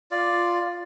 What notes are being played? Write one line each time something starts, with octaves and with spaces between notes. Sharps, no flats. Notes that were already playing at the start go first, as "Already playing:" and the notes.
F4 D5